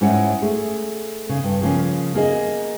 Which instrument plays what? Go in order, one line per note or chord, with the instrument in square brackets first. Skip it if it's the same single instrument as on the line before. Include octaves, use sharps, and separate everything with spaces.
[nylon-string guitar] G#2 C#4 E4 C#5 F#5
A3 G#4
C#3
G2
C#3 F3 A#3 C#4
A#3 G#4 D#5